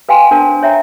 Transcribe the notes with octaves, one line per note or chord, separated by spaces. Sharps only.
B4 F5 G5 G#5 C6
D4 A#4 C5 A5
C#5 E5 G5 A#5